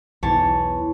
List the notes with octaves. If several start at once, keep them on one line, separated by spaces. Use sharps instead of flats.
B1 E2 E3 C#5 A5